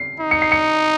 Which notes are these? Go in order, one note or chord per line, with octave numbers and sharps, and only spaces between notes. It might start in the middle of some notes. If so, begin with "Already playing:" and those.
Already playing: C7
D#4
C#7
C7
C#7